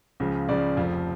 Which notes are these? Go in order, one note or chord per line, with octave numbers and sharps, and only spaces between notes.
C#2 C#3 F3
C#2 C#3 F3 D5
F1 F2 F3